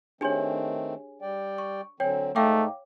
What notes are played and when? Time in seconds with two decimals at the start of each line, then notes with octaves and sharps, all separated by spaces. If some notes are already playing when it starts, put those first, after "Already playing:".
0.21 D#3 A3 C4 D4 G4 G#4 C#5 G#5
1.22 G3 D5 G5
1.58 C#6
2.00 D3 F#3 C4 C#5 G5 G#5
2.36 G#2 A3 D#4 F5 G5 D6